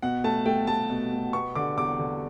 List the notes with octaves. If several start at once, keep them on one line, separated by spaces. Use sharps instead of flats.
B2 F#5
A3 A5
A3 G5
A3 A5
B2
B2
B3 C#6
D3 D6
E2 D6
D3